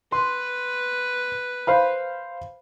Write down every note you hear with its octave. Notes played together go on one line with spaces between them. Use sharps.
B4 C6
C5 F5 B5